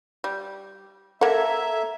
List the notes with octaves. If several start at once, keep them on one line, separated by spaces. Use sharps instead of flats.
G3
A#3 A4 E5 F#5 A#5 G#6